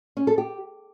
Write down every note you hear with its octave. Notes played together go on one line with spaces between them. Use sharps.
C#4
A4
G4